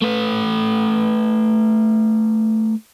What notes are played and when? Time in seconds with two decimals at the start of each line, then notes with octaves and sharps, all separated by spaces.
0.02 A3 B4